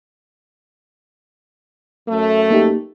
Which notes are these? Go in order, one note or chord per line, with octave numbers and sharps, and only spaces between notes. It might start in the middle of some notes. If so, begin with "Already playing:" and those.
F#2 A3
A#3 D#4 G4